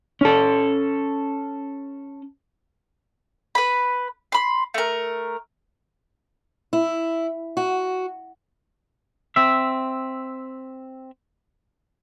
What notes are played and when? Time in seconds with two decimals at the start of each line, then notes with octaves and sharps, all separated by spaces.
0.21 C#4 A4
3.55 B4 B5
4.32 B5 C6
4.74 A3 A#4
6.73 E4
7.57 F#4
9.36 C4 E5